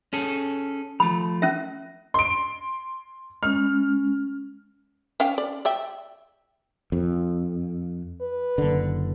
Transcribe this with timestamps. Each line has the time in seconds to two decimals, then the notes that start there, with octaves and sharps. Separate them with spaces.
0.13 C#4 G#4 A4
1.00 F3 A3 B5
1.42 C#4 E5
2.14 C6 D7
3.43 G#3 C#4 F6
5.20 C#4 F5 G5
5.38 D5
5.65 D5 E5 G5
6.92 F2
8.21 B4
8.58 F#1 D3